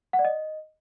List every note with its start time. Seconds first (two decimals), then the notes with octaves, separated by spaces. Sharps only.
0.13 F#5
0.19 D5
0.25 D#5